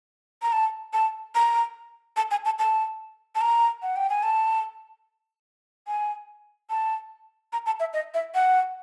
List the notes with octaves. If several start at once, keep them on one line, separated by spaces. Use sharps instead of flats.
A#5
A5
A5
A#5
A5
G#5
A5
A5
A5
A#5
F#5
G5
G#5
A5
G#5
A5
A#5
A5
E5
D#5
E5
F#5